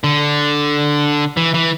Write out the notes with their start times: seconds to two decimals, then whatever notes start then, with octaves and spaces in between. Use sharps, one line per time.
0.04 D3
1.37 E3
1.54 E3